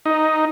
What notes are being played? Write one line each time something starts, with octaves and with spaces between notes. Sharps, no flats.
D#4